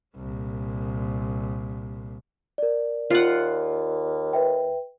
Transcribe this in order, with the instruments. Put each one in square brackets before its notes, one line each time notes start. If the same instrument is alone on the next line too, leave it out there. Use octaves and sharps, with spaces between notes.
[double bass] C2 A#2
[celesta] A#4 D5
[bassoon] D#2 [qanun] F4 F#5
[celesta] B4 E5 G5